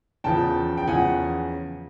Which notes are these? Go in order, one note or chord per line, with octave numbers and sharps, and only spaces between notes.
E2 C#3 F3 G5 A5
G5
E2 C#3 F3 F#5 G#5